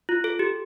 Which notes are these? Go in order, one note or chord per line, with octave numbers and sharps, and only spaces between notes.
F4
A4
G4